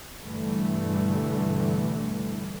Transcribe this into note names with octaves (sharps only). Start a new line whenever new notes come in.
G2 B2 D3 E3 G3 A3